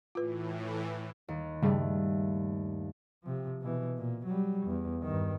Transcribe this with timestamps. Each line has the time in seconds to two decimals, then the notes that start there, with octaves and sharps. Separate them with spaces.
0.15 A2 E3 F4 B4
1.28 D#2
1.62 G2 C#3 G3 A3 G#4
3.23 C3 F3
3.61 B2 E3
3.97 A#2
4.26 F#3 G3
4.66 E2
5.02 G2 D#3